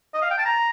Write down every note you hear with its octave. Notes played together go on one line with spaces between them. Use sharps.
D#5
F5
G5
A5
A#5